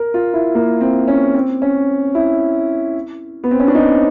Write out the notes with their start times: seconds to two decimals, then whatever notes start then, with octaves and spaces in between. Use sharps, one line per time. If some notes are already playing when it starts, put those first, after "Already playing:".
Already playing: A#4
0.14 F4
0.34 E4
0.55 A#3
0.81 C4
1.08 C#4
1.34 C4
1.62 C#4
2.15 E4
3.44 B3
3.51 C4
3.59 C#4
3.68 D4
3.75 D#4